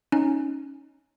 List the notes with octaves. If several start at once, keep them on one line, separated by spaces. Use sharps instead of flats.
C#4 D#4